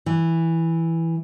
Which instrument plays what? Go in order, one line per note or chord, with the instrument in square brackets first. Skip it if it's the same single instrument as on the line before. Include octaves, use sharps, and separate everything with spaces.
[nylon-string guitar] E3